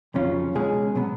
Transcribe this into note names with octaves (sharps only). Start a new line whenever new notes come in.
F2 C#3 F#3 C#4 F4
C#2 B2 G#3 C#4 G#4
B2 F#3 B3